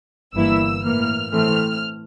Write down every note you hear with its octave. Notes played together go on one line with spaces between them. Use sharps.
G1 G2 E3 A#3 E4 E6
A2 E3 A#3 F6
A2 E3 A3 C4 F6